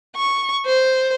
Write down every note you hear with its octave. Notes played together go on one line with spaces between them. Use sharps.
C#6
C5